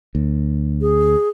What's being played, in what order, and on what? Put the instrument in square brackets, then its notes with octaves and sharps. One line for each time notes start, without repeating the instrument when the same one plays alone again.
[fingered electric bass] D2
[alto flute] G#4